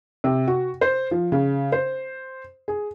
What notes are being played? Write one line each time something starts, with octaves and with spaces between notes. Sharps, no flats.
C3
F#4
C5
F3
C#3
C5
G#4